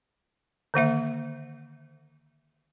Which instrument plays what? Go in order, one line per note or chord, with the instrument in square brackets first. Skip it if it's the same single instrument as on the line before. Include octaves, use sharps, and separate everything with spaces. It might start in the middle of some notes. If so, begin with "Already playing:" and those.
[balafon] D3 D#3 A#3 E5